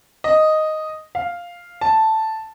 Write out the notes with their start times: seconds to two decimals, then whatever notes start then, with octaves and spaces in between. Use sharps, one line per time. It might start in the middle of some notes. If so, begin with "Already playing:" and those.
0.24 D#5
1.15 F5
1.81 A5